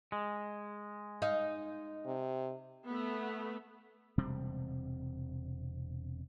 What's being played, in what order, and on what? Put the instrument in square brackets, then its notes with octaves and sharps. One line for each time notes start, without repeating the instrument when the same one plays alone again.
[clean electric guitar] G#3
[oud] D#4 F5
[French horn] C3
[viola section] A3 B3
[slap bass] E1 C3 G3 C4